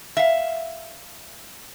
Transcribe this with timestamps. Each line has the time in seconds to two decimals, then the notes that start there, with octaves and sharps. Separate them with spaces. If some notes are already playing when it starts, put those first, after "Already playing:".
0.17 E5 F5